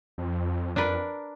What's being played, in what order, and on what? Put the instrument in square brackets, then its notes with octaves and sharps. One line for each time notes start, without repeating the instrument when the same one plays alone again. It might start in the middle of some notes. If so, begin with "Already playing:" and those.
[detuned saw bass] F2
[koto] D4 A#4 B4